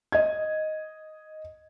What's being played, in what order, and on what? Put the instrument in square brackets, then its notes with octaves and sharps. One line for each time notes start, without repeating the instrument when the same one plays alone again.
[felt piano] D#5 G#6